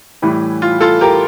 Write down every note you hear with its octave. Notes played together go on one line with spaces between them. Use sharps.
A2 E3 G3
F4
F4 A4
G4 A#4